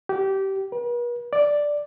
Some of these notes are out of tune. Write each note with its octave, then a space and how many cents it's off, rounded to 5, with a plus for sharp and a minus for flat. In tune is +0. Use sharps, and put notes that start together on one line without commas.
G4 -20
B4 -45
D5 +0